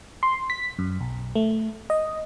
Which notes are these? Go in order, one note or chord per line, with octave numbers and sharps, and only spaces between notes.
C6
B6
F#2
B1
A3
D#5